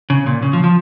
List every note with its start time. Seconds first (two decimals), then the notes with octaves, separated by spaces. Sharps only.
0.10 C#3
0.26 A#2
0.42 C#3
0.53 F3
0.64 F3